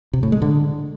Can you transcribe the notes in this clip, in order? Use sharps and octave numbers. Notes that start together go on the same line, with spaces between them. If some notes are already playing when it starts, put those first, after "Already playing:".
C3
A2
G#3
D3